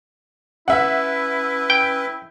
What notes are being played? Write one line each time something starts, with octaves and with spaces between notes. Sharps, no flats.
C#4 E4 B4 E5 F#5
G5